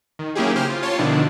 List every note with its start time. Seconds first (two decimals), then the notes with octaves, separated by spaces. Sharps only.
0.19 D#3
0.35 F#3 A#3 C#4 E4 G4 G#4
0.56 C#3 G4 C5 F6
0.70 F4
0.82 F4 C#5 A5 C6
0.98 B2 D3 D#3 F3 D4 E4